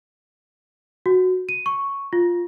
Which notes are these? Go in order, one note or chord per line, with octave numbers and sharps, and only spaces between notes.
F#4
D#7
C#6
F4